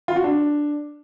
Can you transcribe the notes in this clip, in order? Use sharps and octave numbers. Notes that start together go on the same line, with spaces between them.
F4
F#4
D4